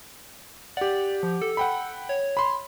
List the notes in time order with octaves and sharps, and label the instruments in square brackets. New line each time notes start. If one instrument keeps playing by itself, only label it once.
[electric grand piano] G4 F#5 [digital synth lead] D5
[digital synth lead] F3
A4
[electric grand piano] F#5 G5 B5
[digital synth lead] C#5
[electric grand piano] B5 C6